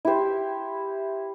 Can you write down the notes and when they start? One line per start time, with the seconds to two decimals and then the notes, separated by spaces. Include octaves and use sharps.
0.05 E4 G4 C5